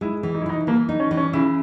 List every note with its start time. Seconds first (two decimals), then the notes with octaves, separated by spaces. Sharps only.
0.01 G#3 E4
0.23 E3
0.35 D#4
0.42 E4
0.46 E3 D#4
0.67 E3 A#3
0.89 D#4
1.00 C#4
1.11 E3
1.17 C#4
1.33 C#3 E4